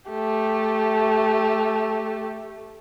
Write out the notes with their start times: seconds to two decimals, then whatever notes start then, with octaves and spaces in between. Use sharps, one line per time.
0.10 A3 G4